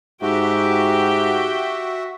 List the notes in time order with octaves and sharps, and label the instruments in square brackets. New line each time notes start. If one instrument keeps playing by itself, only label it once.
[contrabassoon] G#2 [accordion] F#4 E5 [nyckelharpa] G4 G5